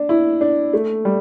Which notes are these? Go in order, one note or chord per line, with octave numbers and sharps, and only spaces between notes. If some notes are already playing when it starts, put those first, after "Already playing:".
Already playing: D4
E4
D4
A3
G3